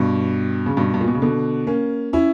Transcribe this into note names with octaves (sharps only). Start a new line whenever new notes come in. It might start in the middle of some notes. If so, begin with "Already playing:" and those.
Already playing: G2 B2
C#3
G2 B2
G2
A#2
B2
C#3
B2 D3
A#3 C#4
C#4 E4